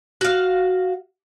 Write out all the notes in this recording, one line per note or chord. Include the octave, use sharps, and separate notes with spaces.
F#4 F5